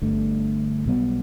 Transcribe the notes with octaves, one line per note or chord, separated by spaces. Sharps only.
G1 G2 D3 A3
B1 B2 G3 B3